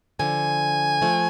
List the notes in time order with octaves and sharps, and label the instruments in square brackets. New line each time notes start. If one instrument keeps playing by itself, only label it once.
[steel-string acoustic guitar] D3 F3 [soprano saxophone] G#5
[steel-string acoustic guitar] F3 A3